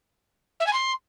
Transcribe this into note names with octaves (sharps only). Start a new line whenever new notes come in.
E5
G#5
C6